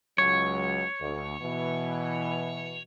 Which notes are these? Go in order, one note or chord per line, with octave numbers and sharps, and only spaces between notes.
C#2 F#3 C#5
D2
B2 E3